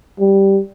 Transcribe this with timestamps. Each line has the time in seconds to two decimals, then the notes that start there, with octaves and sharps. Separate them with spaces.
0.20 G3